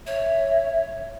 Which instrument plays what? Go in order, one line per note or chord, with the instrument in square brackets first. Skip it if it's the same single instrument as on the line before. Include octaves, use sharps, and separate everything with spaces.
[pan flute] C#5 [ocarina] E5